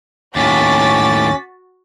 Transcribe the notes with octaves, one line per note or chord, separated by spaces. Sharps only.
D#2 A2 C#4 F#4 D6 A6 B6